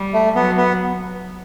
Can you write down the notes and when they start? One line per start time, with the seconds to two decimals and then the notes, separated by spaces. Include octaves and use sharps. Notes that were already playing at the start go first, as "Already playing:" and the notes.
Already playing: G3
0.14 A3
0.35 F#3 B3
0.57 B3